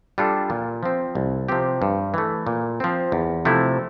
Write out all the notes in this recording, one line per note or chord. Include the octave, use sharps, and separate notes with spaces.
G3 D4 F4 A4
A#2
F3 C4
C2
C3 F3 C4 G4
G2
E3 A3
A#2
F3 C4
E2
C3 F3 A3 E4